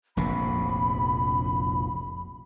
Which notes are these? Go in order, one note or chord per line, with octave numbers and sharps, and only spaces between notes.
F1 A#1 C3 B5